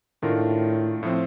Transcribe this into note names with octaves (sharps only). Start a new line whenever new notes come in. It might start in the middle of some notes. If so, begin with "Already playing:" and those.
A2 D#3 A3 D4 F4 A#4
A2 F3 C4